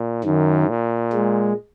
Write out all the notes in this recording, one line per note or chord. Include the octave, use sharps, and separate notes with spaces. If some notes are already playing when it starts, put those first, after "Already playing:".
Already playing: A#2
F#2 D#3
A#2
G#3